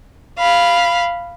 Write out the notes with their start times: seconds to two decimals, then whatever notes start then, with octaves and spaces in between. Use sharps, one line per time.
0.39 F5 B5